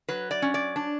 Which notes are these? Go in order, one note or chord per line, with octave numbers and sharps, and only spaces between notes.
F#3 B4
D5
C#4
D5
D4